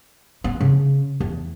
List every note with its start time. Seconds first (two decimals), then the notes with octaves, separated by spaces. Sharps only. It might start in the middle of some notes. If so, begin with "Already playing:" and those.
0.44 B3
0.61 C#3
1.20 E2